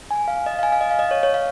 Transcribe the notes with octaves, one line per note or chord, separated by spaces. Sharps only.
G#5
F5
D#5
F5
G#5
F5
D#5
F5
D#5
C#5
C#5
F5